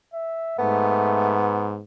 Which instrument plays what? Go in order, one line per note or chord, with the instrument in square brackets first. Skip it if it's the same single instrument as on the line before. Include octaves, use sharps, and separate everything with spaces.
[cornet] E5
[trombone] G#2 [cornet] A3 [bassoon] B3